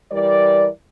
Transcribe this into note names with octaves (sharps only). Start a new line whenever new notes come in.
E3 G3 A#4 D5